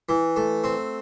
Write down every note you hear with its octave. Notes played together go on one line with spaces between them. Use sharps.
E3
A3
C4